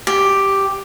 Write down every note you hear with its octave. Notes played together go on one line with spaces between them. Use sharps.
G4